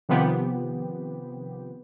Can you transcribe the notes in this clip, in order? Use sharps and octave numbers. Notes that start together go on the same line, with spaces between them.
C3 D#3 F3 B3 C4 G4